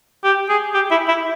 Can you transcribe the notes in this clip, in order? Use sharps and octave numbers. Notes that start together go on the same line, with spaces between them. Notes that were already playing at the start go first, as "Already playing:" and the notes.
G4
G#4
G4
E4
E4